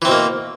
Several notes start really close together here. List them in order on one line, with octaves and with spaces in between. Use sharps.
E3 C4 B2 A#3